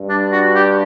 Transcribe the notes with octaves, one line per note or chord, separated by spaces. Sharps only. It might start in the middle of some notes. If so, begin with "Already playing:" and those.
Already playing: G2
D4
F#4
G4